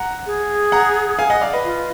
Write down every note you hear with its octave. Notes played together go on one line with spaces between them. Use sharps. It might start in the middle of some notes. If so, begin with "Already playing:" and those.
Already playing: F#5 A#5
G#4
F#5 A#5
F5 G#5
D#5 F#5
D5 F5
B4 D#5
F4